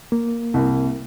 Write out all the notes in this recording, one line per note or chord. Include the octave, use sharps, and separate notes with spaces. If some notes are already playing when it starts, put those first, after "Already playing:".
A#3
C2